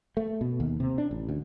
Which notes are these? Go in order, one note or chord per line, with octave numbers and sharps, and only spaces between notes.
A3
B2
D#2
C3
D4
A1
D2